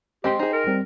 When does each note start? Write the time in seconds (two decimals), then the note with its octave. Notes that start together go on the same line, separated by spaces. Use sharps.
0.24 G#3 C4 G4 D#5 G5 C6
0.39 D#4 G#4 C5
0.53 A#4
0.67 G3 C4